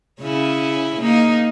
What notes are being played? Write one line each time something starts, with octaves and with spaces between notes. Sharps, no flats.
C#3 C#4 E4
A#3 D#4